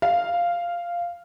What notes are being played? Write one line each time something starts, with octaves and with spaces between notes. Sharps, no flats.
F5